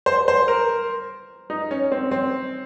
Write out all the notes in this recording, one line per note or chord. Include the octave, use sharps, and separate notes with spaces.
C5
C5
A#4
D#4
C#4
C4
C4